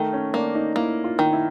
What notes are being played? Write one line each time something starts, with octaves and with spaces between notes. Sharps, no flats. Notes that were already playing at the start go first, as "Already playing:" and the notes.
Already playing: D#3 A3
C#4
A#3 D4
D#4
A#3 E4
F4
D#3
E4